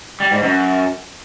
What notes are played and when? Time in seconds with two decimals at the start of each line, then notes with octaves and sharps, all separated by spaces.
0.20 G3
0.31 G#2
0.43 F#2